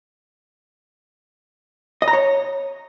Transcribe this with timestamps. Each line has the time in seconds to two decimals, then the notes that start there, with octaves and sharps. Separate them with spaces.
2.02 D#5
2.08 A#5
2.13 C#5